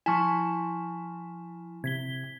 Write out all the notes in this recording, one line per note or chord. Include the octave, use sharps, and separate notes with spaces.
F3 E4 G#5 A5 C#6
C3 G#6 B6 G7